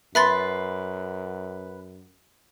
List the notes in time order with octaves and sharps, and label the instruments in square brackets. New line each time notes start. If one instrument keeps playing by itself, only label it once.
[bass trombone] F#2 [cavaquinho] B4 C6 [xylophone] E5 B5 A6